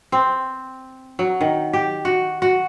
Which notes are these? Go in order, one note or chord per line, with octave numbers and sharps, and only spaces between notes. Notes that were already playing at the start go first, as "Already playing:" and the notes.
C4
F#3
D#3
G4
F#4
F#4